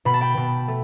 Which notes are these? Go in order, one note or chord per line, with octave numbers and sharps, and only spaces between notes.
B2 B5
A5
G5 B5
B2
A3